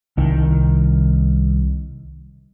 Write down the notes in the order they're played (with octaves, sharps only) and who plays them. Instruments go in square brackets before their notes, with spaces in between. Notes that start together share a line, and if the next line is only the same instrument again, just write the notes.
[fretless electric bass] C2 D#3